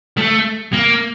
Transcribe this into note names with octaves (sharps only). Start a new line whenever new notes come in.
A3
A#3